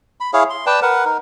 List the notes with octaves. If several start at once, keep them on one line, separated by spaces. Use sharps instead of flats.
B5
E4 G#4 C#5 F5
C6
B4 D5 G5 A5
A#4 B4 F#5
D#4 A#4